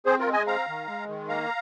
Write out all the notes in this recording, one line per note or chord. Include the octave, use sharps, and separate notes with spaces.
C4 G#4 C5
F4 A#4
G#3
D#5 G#5
C4 F5 A#5
D#3
G#3
D#3
A#3 F5 A#5